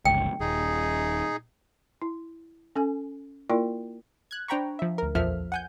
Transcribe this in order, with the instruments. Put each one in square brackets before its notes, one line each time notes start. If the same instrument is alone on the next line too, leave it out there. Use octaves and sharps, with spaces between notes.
[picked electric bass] G1 C#2 [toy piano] G5
[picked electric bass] D#1 [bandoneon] D#4 G#4
[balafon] E4
C#4 A4 G#5
A#3 E4 F4 A#4 D5 G5
[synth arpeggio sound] F#6 G#6
D4 C5 G5 A#5 B5 C#6
F3 E5
D2 A#4
A#1 E2 F3 A4 E5 F6
F#5 G#5 G6